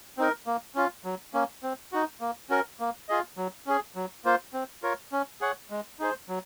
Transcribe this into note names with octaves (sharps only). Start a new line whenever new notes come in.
C4 D#4 A#4
A#3
C#4 F4
F#3
A#3 C#4
C4
D#4 F#4
A#3
C#4 F#4 A#4
A#3
F4 G#4 D#5
F#3
C#4 G#4
F#3
A#3 F4 C5
C4
F4 A#4 C#5
C#4
G#4 C#5 F#5
G#3
D#4 G#4 C5
F#3